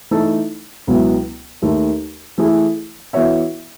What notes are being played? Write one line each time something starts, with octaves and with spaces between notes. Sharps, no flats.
E3 A3 D#4 A4
C#2 B2 F#3 B3 E4
D#2 D#3 A3
E3 A3 E4 G#4
E3 B3 F#4 C#5 E5